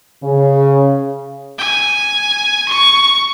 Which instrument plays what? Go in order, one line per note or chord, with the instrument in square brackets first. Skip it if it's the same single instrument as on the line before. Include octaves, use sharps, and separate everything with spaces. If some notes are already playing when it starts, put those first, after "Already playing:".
[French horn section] C#3
[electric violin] G#5
C#6